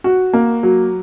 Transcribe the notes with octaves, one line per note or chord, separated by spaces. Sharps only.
F#4
A#3
F#3